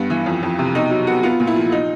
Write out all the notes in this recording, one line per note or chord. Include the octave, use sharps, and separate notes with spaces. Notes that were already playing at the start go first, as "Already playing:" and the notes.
Already playing: G2 B3
E3
F2
F2
C3
B2 D#4
F#3
B3 F#4
B3 F4
A#2
E4
F3
D#4